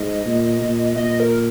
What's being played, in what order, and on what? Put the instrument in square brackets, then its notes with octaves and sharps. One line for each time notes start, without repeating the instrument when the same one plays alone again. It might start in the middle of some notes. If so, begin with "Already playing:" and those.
Already playing: [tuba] G#2 [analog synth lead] D#5
[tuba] A#2
A#2
[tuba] A#2 [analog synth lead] D#5
[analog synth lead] A#4